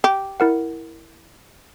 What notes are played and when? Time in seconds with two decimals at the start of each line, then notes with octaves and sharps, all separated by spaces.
0.04 G4
0.40 E4 A#4 F#5